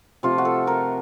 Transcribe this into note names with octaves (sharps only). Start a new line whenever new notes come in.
C3 F3 A3 F4
F#4
A4
A#4